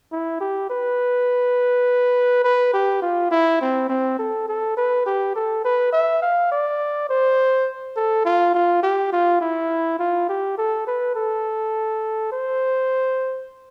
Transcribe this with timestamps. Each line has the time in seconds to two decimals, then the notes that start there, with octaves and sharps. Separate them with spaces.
0.12 E4
0.40 G4
0.70 B4
2.44 B4
2.74 G4
3.02 F4
3.31 E4
3.61 C4
3.89 C4
4.19 A4
4.48 A4
4.77 B4
5.06 G4
5.35 A4
5.64 B4
5.93 E5
6.22 F5
6.52 D5
7.09 C5
7.97 A4
8.25 F4
8.55 F4
8.83 G4
9.12 F4
9.41 E4
9.99 F4
10.29 G4
10.58 A4
10.87 B4
11.16 A4
12.32 C5